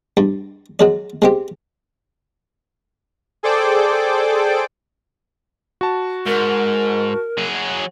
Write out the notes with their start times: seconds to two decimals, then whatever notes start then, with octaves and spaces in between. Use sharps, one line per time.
0.17 G2
0.79 F#3 G#3 D5
1.22 G#3 C4 G4
3.43 G#4 A4 C5 D5 G5 D6
5.81 F#4 A5
6.26 G#2 A#4
7.38 F#3 G#4